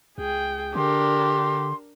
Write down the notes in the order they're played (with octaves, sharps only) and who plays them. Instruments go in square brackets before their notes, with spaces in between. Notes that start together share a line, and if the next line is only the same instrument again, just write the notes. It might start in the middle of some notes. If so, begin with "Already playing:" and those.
[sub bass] C#2 [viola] G#4 G5
[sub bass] D3 [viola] D4 A#4 [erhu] G4 [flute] C6